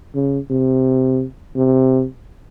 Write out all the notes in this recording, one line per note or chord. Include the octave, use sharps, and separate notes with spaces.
C#3
C3
C3